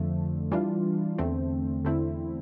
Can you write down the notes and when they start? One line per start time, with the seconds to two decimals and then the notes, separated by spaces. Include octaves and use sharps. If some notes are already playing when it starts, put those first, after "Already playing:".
Already playing: F2 D3 F3 A3
0.51 E3 G3 D4 F4
1.18 E2 D3 A3 C4
1.85 E2 D3 A3 C4 E4